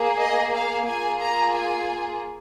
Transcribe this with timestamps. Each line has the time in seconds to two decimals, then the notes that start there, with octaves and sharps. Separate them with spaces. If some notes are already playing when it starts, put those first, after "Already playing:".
Already playing: A#3 G#4
0.18 D#5
0.53 F5
0.86 A#3 F4 G#4 G#5
1.19 A#5
1.52 G#5